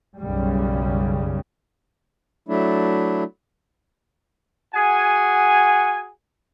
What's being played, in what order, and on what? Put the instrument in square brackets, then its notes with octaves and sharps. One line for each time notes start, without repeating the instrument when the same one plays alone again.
[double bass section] B1 F#2 C#3 G3
[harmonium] F#3 A3 D4 E4
[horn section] F#4 G#4 F#5 G#5